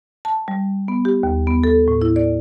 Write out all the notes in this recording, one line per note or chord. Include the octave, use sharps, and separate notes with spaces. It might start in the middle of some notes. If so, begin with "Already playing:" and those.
A5
G3
B3
G4
D#2
B3
A4
A2
E4
D5